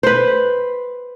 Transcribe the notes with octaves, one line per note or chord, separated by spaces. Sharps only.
B4 C5